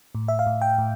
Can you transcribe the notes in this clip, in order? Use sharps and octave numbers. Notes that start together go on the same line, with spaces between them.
A2
E5
F5
A2
G5
A2